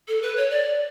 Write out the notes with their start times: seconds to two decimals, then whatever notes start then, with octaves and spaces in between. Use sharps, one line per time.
0.08 A4
0.22 B4
0.37 C#5
0.50 D5